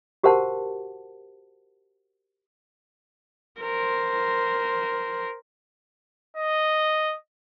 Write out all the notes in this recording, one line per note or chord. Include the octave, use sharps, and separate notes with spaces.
F#4 G4 A#4 C5 F#5 A5
A#4 C5
D#5